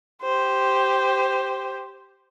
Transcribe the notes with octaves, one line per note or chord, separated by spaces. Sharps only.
G4 C5